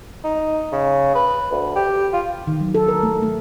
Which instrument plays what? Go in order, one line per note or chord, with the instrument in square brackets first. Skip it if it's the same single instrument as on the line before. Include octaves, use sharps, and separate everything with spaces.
[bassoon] D#4
C#3
B4
D2
G4
F4
[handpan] D#3
F#3
A4
A#4
A3
A3